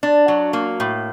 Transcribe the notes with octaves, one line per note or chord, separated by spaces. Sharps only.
D4
F#3
A#3
A2